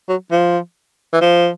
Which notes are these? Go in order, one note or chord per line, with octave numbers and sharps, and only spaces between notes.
F#3
F3
E3
F3